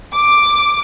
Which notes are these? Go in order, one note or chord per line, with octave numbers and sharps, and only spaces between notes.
D6